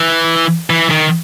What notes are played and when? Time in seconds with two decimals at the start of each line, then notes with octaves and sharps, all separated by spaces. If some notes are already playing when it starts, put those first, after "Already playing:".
Already playing: E3
0.70 E3
0.91 D#3